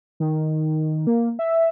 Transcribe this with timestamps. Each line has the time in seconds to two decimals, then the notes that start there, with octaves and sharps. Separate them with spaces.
0.20 D#3
1.07 A#3
1.39 E5